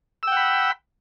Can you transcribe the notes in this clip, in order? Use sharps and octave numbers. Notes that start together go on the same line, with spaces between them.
F#5 G5 B5 E6